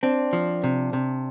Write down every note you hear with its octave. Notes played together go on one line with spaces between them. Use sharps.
C4 D4
F3
C3
C3